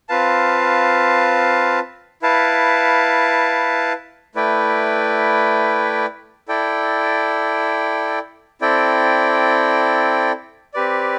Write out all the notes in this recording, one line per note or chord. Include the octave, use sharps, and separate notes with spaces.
C4 F4 B4 F5 A5
E4 B4 F5 A5
A3 E4 B4 D5 G5
E4 A4 D5 G5
C4 E4 A4 D5 G5
C4 G4 B4 D5